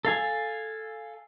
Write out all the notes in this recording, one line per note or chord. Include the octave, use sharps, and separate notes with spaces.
A4 F5 G#5